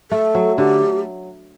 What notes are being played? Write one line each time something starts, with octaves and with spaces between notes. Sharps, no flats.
A3 A4
F#3
D3 G4